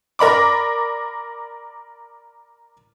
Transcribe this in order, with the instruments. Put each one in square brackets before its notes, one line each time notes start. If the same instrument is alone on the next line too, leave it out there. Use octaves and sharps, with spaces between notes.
[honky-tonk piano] A#4 D5 B5 D6